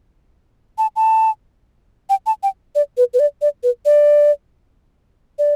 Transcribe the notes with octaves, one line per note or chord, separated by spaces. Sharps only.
A5
A5
G5
A5
G5
D5
B4
B4
D5
D5
B4
D5
D5